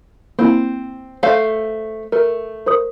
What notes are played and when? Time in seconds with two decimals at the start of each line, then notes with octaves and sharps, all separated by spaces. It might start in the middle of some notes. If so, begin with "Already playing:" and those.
0.39 A#3 C4 E4
1.23 A3 C5 F5
2.12 A3 A#4
2.66 A#4 C5 D#6